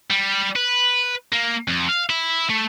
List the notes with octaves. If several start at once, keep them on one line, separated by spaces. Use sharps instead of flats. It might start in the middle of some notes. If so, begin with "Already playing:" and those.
G3
B4
A#3
F2
F5
E4
A3